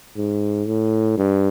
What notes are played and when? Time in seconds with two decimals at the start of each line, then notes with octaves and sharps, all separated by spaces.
0.17 G#2
0.67 A2
1.17 G2